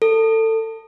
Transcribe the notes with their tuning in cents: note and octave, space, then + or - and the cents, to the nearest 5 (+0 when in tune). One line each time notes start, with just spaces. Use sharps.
A4 +25